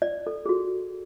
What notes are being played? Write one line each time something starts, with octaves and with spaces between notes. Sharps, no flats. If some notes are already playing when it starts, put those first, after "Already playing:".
D5
A4
G#4
F#4